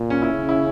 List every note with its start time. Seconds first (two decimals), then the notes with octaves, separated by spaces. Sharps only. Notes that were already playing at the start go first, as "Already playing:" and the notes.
Already playing: A#2
0.10 C#4
0.22 E4
0.33 C#3
0.49 E4